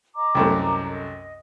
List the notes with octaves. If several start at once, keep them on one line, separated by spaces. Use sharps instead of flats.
D#5 A#5 D6
C2 F#2 A3
D#5